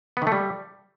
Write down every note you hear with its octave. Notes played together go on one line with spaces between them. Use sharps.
B3
D#3
A3
G3